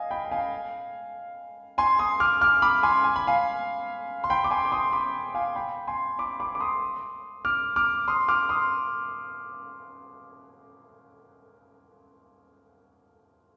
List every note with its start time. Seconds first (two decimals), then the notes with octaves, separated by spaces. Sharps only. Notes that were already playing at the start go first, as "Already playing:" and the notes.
Already playing: D#5 F5 G#5
0.11 G5 B5
0.25 B5
0.31 F5 G#5
1.78 G#5 C6
1.99 C6 D#6
2.20 D6 F6
2.41 D6 F6
2.62 B5 D6
2.83 G#5 C6
3.04 G#5
3.16 B5
3.27 F5 G#5
4.24 C6
4.30 G5 B5
4.44 D6
4.51 G#5 C6
4.65 D6
4.72 C6 D#6
4.93 B5 D6
5.35 F5 G#5
5.56 G5 B5
5.88 G#5 C6
6.19 B5 D6
6.40 B5 D6
6.55 D6
6.60 C6 D#6
7.45 D6 F6
7.76 D6 F6
8.08 C6 D#6
8.28 D6 F6
8.49 C6 D#6